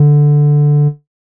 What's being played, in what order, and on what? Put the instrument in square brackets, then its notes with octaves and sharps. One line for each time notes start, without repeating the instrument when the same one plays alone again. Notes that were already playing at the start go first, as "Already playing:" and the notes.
Already playing: [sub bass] D3